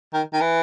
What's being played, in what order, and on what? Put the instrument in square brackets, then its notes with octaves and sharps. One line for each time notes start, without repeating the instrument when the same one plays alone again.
[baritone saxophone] D#3
D#3
E3